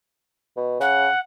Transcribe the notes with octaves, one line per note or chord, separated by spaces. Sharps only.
B2
C#3 F#5